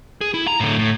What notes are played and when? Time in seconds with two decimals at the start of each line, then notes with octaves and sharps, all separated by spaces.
0.21 G#4
0.34 E4
0.47 A#5
0.60 A2 D3
0.79 A2